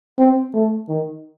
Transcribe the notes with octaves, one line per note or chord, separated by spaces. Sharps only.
C4
A3
D#3